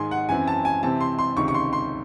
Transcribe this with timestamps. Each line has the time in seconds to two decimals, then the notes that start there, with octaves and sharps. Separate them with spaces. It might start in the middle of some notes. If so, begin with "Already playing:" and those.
Already playing: G#2 D#3 G#3 G#5 C6
0.11 F#5
0.29 F#2 E3 C4 G#5
0.48 A5
0.65 G#5
0.83 C3 E3 C4 A5
1.01 C6
1.19 C6
1.36 C#2 C3 D#3 C#6
1.48 C#6
1.54 C6
1.73 C6